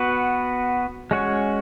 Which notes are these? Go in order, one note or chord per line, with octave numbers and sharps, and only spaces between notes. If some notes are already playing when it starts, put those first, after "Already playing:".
Already playing: B3 F#4 B4
G#3 C#4 F#4 C#5